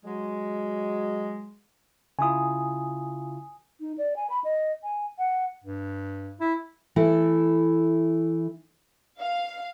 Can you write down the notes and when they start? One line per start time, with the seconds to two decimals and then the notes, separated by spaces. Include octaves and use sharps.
0.04 F#3 G#3
2.19 C#3 E4 F4 G#5 D#6
3.80 D#4
3.98 D5
4.16 G#5
4.30 B5
4.44 D#5
4.83 G#5
5.18 F#5
5.64 G2
6.40 E4
6.96 E3 A3 E4
9.20 F5